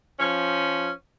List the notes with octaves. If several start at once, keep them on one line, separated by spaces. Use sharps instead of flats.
F3 C#4